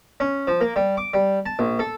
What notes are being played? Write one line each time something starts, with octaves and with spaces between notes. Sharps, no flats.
C#4
F3
A#3
G3
D6
G3
A5
A#1
A4